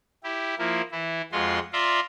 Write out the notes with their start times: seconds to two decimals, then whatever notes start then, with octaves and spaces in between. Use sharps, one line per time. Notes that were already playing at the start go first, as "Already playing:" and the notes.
0.24 E4 G4
0.58 F3 A#3 E4
0.91 E3 E4
1.32 F2 G#3 F4 F#4 C6
1.73 F4 D5 E5 A#5 C6